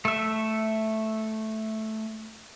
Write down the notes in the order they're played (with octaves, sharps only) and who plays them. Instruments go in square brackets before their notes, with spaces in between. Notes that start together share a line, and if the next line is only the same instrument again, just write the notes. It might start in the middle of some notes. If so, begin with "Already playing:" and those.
[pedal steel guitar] A3 E5